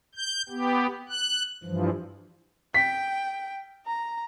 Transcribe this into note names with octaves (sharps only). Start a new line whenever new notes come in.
G6
B3 G4
F#6
G2 E3 F3
G5 B6
A#5